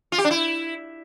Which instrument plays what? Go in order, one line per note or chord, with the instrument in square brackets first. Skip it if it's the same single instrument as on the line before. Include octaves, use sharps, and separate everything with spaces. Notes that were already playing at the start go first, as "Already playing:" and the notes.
[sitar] F4
G4
D4
E4